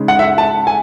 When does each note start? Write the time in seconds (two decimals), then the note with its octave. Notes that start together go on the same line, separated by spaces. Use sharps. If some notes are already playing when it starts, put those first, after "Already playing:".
Already playing: C#3 G#3 D#4
0.08 F#5
0.19 E5
0.22 F#5
0.38 A5
0.67 G#5